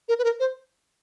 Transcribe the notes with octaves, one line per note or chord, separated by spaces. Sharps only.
A#4
B4
A#4
C5